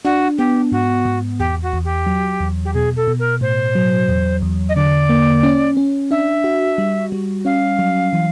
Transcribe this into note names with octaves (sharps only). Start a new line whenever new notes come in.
D4 F#4
B3 G4
G#2 F#4
G#2
E2 G4
F#4
E2
G4
F#3
E2
G4
B2 G#4
A4
B2
A#4
A2 C5
F#3
E2
E2
D#5
D3 D5
A#3
C#4
C#4
D4 E5
F#4
G3
G3
C#4 F5
F#3
E3